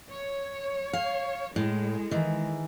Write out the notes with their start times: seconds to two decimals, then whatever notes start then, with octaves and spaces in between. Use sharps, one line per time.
0.11 C#5
0.93 F5
1.56 A2 G#3
2.11 D#3 E3